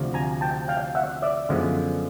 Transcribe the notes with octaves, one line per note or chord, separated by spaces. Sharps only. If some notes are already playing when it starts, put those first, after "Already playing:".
Already playing: D2 C3 F3
G#5 A#5
G5 A5
F5 G5
E5 F#5
D5 E5
F#2 D3 F3 G#3 B3